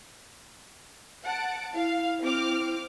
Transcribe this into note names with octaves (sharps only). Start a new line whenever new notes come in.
F#5 A5 D7
E4 F5
C4 D6 F6